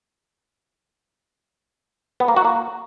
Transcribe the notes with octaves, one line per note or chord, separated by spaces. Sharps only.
B3
A#3
F#4
A#3